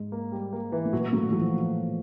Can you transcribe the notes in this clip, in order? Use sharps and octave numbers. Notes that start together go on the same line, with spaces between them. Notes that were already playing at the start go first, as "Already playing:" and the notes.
Already playing: G#2 G#3
A#3
G3
A#3
E3
A3
A#2 F#3 A#3
A#3
A2 F#3 A3
E3 F#3
F3